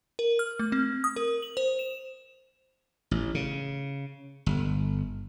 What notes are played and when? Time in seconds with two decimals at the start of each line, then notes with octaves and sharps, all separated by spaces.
0.19 A#4
0.39 F6
0.59 A3
0.72 C4
1.04 D#6
1.16 A#4
1.42 F#7
1.57 C5
1.79 E7
3.11 A1
3.35 C#3
4.46 G1